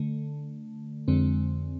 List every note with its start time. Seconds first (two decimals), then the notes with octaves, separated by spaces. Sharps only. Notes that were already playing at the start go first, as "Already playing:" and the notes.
Already playing: D3 A3
1.08 F2 D3 G#3 C4